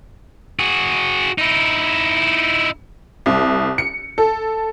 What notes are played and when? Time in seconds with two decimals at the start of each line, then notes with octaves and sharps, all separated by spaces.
0.59 F#4 G#4
1.38 D#4 E4
3.26 C2
3.78 C#7
4.18 A4